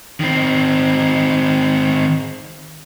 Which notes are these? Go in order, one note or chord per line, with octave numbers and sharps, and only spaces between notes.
D#3 C4